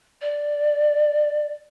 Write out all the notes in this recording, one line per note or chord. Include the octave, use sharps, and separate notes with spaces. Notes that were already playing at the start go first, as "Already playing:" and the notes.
D5